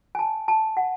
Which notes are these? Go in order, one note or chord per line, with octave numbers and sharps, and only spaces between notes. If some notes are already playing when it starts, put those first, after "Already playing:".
G#5
A5
A5
F#5